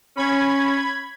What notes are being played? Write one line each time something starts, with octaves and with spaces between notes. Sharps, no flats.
C#4 B5 G#6